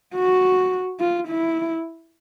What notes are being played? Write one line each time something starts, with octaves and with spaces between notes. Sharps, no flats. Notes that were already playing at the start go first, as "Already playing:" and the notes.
F#4
F4
E4